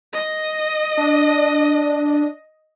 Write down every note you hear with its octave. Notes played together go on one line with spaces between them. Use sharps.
D#5
D4